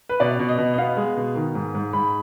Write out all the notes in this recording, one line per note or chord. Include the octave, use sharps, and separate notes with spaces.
B4
B2 D5
B2
D#5
B2
D#5
B3 F5
G#3
B2
D#3
G#2
G#2
G#2 B5